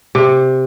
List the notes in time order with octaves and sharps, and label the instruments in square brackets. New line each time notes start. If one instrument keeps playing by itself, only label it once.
[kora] C3